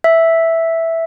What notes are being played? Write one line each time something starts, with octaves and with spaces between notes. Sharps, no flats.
E5